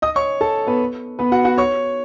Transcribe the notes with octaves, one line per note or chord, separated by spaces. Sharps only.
D#5 D#6
C#5 C#6
A4 A5
B3 B4
B3 B4
F#4 F#5
F#4 F#5
C#5 C#6